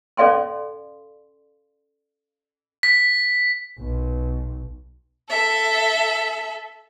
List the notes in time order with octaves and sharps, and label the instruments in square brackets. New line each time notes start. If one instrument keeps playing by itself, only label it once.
[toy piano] C#4 A4 D5 F5 G#5 C6
[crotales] B6
[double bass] B1
[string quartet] A4 E5